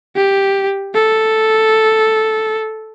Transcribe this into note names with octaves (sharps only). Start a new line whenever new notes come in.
G4
A4